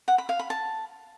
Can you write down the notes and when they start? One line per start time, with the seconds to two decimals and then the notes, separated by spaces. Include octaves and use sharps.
0.08 F#5
0.18 B5
0.29 F5
0.39 B5
0.50 A5